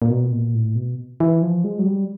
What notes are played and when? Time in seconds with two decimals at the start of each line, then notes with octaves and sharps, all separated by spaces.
0.02 A#2
0.10 B2
0.32 A#2
0.55 A2
0.75 B2
1.20 E3
1.42 F3
1.64 G#3
1.79 F#3
1.86 G3